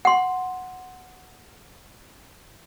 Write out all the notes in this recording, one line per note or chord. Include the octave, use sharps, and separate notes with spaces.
F#5 C6